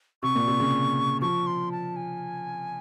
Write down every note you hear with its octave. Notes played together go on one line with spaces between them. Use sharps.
C3 C#6
A#2
C3
C#3
F3 C#6
C6
A5
G#5